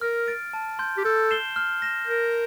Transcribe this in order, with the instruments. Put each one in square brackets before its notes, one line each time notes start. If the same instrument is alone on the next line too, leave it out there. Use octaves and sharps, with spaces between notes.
[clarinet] A#4 [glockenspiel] F6
[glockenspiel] A6 D7
A5
C6 G6
[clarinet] G4
[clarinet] A4 [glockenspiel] G6
[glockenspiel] C7 E7 G7
F6
A#6 E7
[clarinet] A#4 [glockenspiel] G6